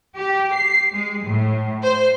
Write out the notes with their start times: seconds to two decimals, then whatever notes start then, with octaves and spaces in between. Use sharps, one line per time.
0.17 G4
0.53 C7
0.94 G#3
1.25 A2
1.83 C5